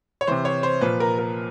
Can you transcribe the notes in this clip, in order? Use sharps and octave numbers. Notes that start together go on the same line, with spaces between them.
C#5
C3 E3 C5
C#5
C5
A#2 F3 B4
A#4
A#4